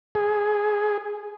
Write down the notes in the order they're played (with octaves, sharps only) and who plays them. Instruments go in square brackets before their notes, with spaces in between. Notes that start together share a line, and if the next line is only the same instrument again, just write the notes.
[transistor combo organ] G#4